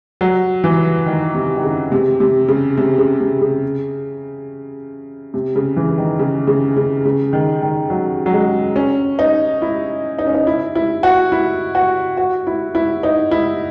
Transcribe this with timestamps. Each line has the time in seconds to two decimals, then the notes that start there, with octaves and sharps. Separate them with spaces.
0.21 F#3
0.64 E3
1.06 D#3
1.34 C3
1.56 D#3
1.64 C#3
1.92 C3
2.20 C3
2.48 C#3
2.77 C3
2.98 C#3
3.20 C3
3.41 C#3
5.34 C3
5.56 C#3
5.76 E3
5.98 D#3
6.19 C#3
6.47 C#3
6.76 C#3
7.05 C#3
7.33 D#3
7.62 D#3
7.90 F#3
8.26 F#3
8.33 G#3
8.76 C#4
9.19 D#4
9.62 E4
10.19 D#4
10.27 C#4
10.35 D#4
10.47 E4
10.75 E4
11.03 F#4
11.32 E4
11.75 F#4
12.17 F#4
12.47 E4
12.75 E4
13.03 D#4
13.31 E4